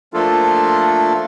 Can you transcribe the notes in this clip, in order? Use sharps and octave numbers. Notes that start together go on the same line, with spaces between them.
F3 A3 A#3 D4 F4 A4